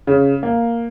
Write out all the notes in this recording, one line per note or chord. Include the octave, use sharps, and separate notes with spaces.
C#3
A#3